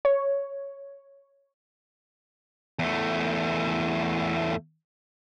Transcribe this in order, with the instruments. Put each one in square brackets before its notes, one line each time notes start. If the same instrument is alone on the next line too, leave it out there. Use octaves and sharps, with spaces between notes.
[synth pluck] C#5
[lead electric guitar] E2 A3